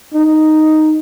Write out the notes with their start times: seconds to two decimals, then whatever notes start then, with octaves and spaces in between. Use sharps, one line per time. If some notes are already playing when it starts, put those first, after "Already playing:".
0.14 D#4